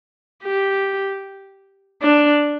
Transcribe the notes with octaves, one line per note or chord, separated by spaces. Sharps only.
G4
D4